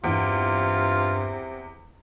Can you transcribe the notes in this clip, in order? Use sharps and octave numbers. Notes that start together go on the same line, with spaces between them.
E2 G2 C3 F4